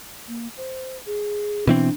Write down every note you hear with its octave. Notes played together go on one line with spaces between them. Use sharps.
A#3
C5
G#4
B2 E3 C4 D4